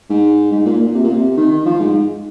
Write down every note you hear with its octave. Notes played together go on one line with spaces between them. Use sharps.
G#2
G#2
A#2
A#2
C3
A#2
C3
D#3
D#3
F3
G#2
G#2